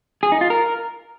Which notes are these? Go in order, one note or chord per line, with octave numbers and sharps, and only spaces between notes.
G#4
D#4
F4
A#4